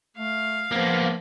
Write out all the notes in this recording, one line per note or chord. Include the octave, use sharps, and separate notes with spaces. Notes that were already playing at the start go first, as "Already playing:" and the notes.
A3 F5
F3 A#3 B3